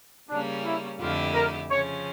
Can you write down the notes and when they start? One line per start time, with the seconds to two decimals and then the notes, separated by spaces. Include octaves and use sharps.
0.29 C#3 G3 A#3 C#4 D4
0.64 E4
1.00 F2 D3 A3 E4 F4 G4
1.34 A#4
1.70 C#3 F3 C#4 C#5